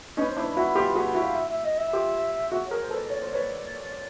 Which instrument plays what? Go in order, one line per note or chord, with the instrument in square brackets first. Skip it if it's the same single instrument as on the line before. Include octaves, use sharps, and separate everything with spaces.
[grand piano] C#4 D#4 [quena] B4
[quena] C5
[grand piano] D4 E4
[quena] C5
B4
[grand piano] E4 F#4
F4 G4
F#4 G#4
E4 F#4
[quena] F5
E5
E5
D#5
E5
[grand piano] F4 G4
[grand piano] F#4 G#4 [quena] E5
[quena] C#5
[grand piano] G#4 A#4
[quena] C5
[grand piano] A4 B4
[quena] D5
[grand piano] C#5 [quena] D5
[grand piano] C5
B4 C#5